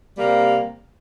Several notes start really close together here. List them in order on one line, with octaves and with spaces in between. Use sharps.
G3 A#3 C3